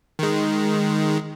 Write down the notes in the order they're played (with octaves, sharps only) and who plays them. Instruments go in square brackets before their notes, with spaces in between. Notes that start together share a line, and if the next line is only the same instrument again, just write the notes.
[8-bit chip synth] D#3 G#3